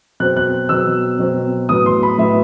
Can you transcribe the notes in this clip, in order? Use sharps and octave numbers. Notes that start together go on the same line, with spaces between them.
B2 F#3 C4 F#6
F#6
B2 F#3 C4 E6
B2 F#3 C4
A2 F#3 B3 D#6
C6
B5
A2 F#3 B3 E5